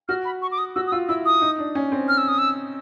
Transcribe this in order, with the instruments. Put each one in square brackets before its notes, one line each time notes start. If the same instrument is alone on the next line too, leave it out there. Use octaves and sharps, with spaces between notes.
[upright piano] F#4 [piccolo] F6
[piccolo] B5
C#6
D6
D#6
[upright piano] F#4 [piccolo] E6
[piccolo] D#6
[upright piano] F4 [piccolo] E6
[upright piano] E4 [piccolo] E6
[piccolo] D#6
[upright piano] D#4
D4
C#4
C4
[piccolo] F6
E6
D#6
E6